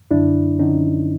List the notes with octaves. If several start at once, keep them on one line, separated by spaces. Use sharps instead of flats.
F#2 D3 D4 E4
D3 C#4 D#4